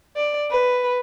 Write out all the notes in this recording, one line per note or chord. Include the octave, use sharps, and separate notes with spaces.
D5
B4